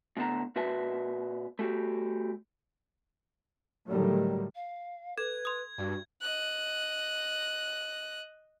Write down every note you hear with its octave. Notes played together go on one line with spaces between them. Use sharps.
A2 D3 B3 A5 A#5
A#2 F#4 B4 E5 A5
A3 F#4 G4
A2 D3 D#3 F#3 G3 A3
F5
A4 B4 G#6
C6 D#6
G2 F#4
D#5 F#6